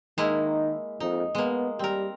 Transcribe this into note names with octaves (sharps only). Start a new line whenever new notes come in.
D#3 G#3 A#3 E4
F2 D#4
G#3 A#3 B3
G3 C4 A#4